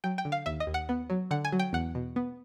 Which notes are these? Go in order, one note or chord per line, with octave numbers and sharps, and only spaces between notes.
F#3 G5
G5
D3
F5
D#2 E5
D#5
D#2
F#5
B3
F#3
D3 F#5
G#5
F#3
G5
E2 F#5
B2
B3